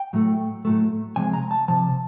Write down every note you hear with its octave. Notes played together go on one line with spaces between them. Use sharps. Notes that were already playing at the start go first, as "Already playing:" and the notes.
Already playing: G5
A2 F#3 A3
A2 F#3 A3
C3 F3 G#3 G#5
A#5
A5
C3 F3 A5